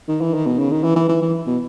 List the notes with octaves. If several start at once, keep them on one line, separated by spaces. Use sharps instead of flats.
D#3
E3
D#3
B2
C#3
D#3
E3
E3
E3
E3
B2